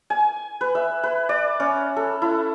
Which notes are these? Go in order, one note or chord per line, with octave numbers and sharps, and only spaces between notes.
G#5
B4
E5
B4
D5
C#4
A4
E4